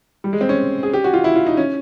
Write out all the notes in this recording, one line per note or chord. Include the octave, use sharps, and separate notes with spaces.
G3
G#3
C4
C#4
G#4
G4
F#4
F4
E4
F4
D#4
C#4